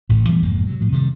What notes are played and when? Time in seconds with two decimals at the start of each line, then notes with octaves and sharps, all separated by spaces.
0.09 A1 D2 A2
0.28 B2 E3 G3 B3
0.42 F1 F2 G#2 A#3
0.67 C3 F#3
0.80 A2 F3
0.92 C3 D#3 F3 G3